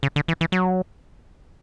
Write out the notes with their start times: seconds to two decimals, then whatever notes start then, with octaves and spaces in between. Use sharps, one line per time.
0.03 C#3
0.16 D3
0.28 E3
0.41 E3
0.52 F#3